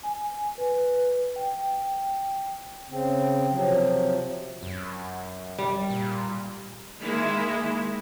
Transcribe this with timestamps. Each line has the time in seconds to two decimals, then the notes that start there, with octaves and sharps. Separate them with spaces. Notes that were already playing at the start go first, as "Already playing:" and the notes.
0.03 G#5
0.58 B4
1.36 G5
2.90 C#3 C4
3.52 C3 F3 F#3
4.63 F#2
5.58 G3
5.90 A#2
7.01 D#3 G#3 A#3 E4